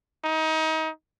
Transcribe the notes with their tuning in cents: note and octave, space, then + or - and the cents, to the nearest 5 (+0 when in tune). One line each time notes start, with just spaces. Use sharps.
D#4 +30